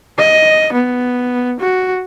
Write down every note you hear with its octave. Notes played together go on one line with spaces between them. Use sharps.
D#5
B3
F#4